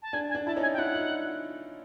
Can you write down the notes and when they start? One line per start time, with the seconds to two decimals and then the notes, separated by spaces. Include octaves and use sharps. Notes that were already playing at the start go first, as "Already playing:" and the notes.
0.02 A5
0.13 D4 G#5
0.29 G#5
0.35 D4
0.46 E4 A5
0.56 C#4 D#4
0.62 G#5
0.73 G5
0.78 D4 E4 F#5
0.95 D#4 F4